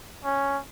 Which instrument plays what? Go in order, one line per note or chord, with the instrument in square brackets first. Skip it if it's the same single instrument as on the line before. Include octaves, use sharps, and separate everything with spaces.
[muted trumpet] C#4